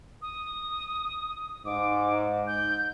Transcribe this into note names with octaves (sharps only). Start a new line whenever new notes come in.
D#6
G#2 D6
G6